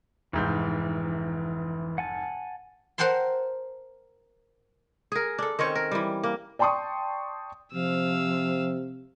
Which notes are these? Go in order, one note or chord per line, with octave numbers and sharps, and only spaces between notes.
F1 G#2 E3 G6
F#5 G#5 A5
A#4 C5 F#5 G5 A5 C6
G#4 A#4
D4 A4
D#3 C4 C#4 C#5
A#4
E3 G3
A#3
D5 G5 A5 C6 C#6 D#6
C3 F3 F5 E6